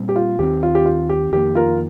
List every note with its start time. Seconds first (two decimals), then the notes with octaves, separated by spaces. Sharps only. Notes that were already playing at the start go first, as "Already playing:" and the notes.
Already playing: A#2 G3 C4
0.09 G4
0.16 F4
0.39 D#2 D#3 G3 C4 G4
0.63 F4
0.75 G4
0.86 F4
1.09 G4
1.32 F2 D#3 A#3 G4
1.55 F4 A#4